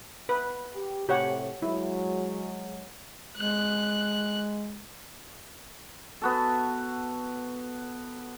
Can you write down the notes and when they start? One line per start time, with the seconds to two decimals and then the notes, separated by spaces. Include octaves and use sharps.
0.29 B4
0.75 G4
1.09 A2 C3 G4 C#5 F#5
1.62 F#3 G#3 E4
3.37 G#3 F#6
6.22 B3 F#4 A4